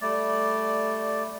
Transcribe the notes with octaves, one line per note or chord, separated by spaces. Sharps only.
G3 A3 D5